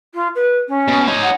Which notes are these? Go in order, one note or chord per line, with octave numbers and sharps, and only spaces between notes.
F4
B4
C#4
B2
D#4 C#5
F#5